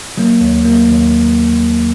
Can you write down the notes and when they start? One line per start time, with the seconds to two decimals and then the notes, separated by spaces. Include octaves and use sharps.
0.17 C#3 F#3 A#3
0.41 D#2
0.65 C#3 F#3 A#3
0.89 D#2